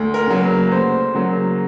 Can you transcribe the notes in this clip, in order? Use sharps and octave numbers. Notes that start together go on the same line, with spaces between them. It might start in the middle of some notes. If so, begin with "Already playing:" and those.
Already playing: D2
A#4
C#3 F#3 A#3
B4
D2 C5
C#3 F#3 A#3